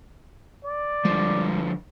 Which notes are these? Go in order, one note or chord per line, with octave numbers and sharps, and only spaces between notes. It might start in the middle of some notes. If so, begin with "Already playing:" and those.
D5
D3 F3 G3 G#3